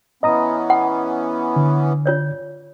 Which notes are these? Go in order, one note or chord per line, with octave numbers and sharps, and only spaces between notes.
E3 B3 C#4 D#5 A#5 D#6
F#5
D3
F4 C#5 D5